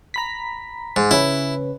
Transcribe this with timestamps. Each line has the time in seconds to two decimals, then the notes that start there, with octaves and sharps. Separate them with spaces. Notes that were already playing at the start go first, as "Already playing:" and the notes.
0.14 A#5 B5 B6
0.96 G#2
1.11 C#3 C#4 E4 B4